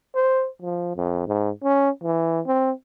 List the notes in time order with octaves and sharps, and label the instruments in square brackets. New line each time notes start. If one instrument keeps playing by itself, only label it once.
[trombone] C5
F3
F2
G#2
C#4
E3
C4